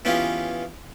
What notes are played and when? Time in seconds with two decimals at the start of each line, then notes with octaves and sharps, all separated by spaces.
0.05 E3 B3 C#4 F4 G4 G#4